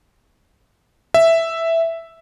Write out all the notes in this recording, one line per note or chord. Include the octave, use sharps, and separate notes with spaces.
E5